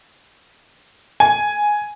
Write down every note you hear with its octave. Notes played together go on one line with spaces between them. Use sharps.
G#5